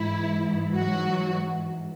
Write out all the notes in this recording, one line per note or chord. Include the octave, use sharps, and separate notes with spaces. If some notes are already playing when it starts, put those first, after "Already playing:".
Already playing: G#2 E3 E4
F#3 F#4